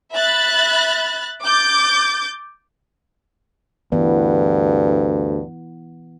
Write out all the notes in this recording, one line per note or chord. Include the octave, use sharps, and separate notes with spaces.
E5 B5 F#6 A6
D6 G6 A6
D2 G2 E3 B3